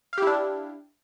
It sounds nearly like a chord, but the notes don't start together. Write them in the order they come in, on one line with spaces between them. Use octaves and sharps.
F5 G4 E4 D4